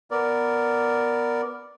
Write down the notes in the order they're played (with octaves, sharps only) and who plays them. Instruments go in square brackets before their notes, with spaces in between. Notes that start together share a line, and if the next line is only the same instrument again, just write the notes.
[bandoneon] B3 A#4 D5